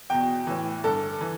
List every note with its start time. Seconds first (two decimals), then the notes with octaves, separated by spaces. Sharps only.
0.10 E2 B2 G5
0.47 A2 E3
0.84 G2 D3 A4
1.21 E3